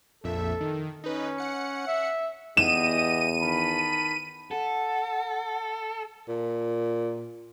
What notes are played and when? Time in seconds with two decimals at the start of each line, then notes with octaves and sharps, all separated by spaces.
0.24 A#1 F2 A4 E5
0.60 D#3
1.04 C#4 D#4 B4
1.38 F#5 C#7
1.88 E5
2.57 E2 B3 G4 D#5 D#7 E7
3.41 D#3 A5 B5
4.51 A4 F#5
6.29 A#2